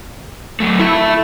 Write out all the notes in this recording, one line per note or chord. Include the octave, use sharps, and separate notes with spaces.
F#3 A3
E4 A4 E5